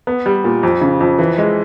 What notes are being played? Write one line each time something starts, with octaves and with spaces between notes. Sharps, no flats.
B3
G3
A#2
F2
C#3
F2
E3
G#3